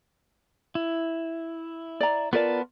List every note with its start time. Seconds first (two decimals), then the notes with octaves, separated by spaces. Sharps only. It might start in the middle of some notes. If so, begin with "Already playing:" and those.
0.75 E4
2.00 D5 A#5
2.33 B3 F4 A#4 B4 D5 A5